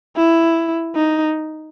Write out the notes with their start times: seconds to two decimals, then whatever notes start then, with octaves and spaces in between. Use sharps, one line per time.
0.17 E4
0.95 D#4